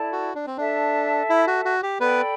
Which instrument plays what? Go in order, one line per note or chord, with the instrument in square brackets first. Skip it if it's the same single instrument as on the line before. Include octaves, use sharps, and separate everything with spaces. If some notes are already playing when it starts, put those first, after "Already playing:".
Already playing: [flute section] E4 A4 D5 A5
[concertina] F#4
D4
C4
[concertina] D4 [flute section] A4 E5 A5
[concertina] E4
F#4
F#4
G4
[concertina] B3 B4 [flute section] A4 D5 G5 B5